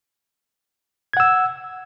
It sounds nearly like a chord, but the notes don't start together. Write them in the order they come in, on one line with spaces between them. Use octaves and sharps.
G#6 F#5 E6